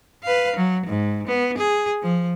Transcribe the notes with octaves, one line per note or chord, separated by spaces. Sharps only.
B4 F5
F#3
G#2
B3
G#4
F3